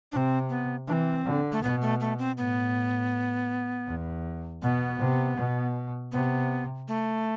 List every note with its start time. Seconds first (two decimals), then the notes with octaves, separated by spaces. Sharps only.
0.12 C3 C4 D4
0.49 B3
0.87 E3 D4
0.93 C4
1.25 D3
1.52 A3
1.63 B2 B3
1.82 A3
2.00 A3
2.19 C4
2.37 A2 B3
3.87 E2
4.62 B2 B3
5.00 C3
5.37 B2
6.12 C3 B3
6.88 A3